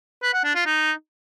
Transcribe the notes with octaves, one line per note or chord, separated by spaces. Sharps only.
B4
F#5
D4
F4
D#4